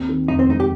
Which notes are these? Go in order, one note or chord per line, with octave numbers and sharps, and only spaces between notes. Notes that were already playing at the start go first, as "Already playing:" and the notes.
Already playing: D#2 C4
D#3
F1 D#4
C4
G#3 D#4
G4